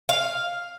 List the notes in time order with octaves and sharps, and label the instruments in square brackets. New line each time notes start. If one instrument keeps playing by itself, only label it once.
[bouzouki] F5